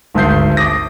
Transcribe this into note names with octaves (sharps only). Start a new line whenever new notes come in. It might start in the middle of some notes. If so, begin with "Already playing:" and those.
G#1 D2 A5 G6 C7
D6 D#6 A#6